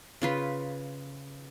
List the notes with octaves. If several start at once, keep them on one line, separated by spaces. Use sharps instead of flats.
C#3 F4 B4